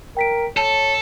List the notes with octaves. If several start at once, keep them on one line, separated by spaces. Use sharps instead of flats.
A#4 G5 B6 D7
A4 C#5 A5